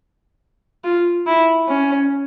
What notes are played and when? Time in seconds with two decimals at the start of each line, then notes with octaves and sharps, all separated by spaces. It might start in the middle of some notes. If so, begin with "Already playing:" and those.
0.84 F4
1.27 E4
1.69 C#4